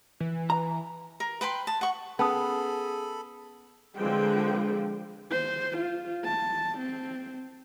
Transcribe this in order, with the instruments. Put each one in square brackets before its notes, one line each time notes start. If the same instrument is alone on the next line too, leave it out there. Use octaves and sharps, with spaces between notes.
[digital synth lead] E3
[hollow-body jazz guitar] A#5
[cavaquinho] A#4
B4 G5 B5 C6
A5
F#5 C#6
[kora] B3 [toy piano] C#4 A5 D#6 [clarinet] G#4 [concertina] A4 B5
[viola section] D3 F3 G#3 C4 B4 G5
[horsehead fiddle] C5
F4
A5
C4